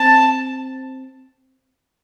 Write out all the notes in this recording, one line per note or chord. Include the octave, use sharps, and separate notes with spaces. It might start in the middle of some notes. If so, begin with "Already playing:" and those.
Already playing: C4 A5